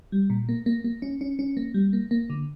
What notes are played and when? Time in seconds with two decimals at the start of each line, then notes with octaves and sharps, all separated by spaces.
0.12 G3
0.30 A#2
0.49 A#3
0.66 A#3
0.84 A#3
1.02 C#4
1.21 C#4
1.39 C#4
1.57 A#3
1.74 G3
1.93 A#3
2.11 A#3
2.30 D3